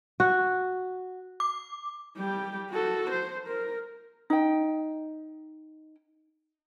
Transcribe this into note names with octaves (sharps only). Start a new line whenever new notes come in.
F#4
D6
G3 G4
F#4 A4
C5
A#4
D#4 G5